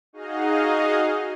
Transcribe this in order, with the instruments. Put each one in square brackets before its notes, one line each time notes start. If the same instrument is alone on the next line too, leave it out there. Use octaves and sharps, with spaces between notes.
[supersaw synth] D#4 F#4 G#4 D#5 F5